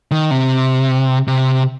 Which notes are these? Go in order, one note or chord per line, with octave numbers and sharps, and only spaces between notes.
D#3
C3
C3